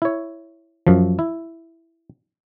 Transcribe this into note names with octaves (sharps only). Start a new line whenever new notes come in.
E4 C#5
F#2 F3
E4